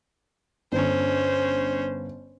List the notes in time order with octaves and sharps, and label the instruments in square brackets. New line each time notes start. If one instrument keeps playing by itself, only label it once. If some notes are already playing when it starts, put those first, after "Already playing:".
[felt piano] G1 D3 [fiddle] C#4 C5